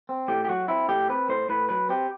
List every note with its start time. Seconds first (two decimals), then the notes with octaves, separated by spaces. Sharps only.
0.09 C4
0.28 A2 G4
0.45 G4
0.49 F#3 F#4
0.68 C4 E4
0.88 A2 G4
1.09 C4 B4
1.29 A2 C5
1.49 A2 B4
1.69 F#3 B4
1.89 C4 G4